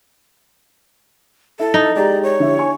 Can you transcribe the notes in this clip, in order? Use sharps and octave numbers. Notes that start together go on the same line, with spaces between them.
E4 A4
D#4
G#3 G4 D5 A#5
C#5
D3 E4 G4
D4 G#5 C#6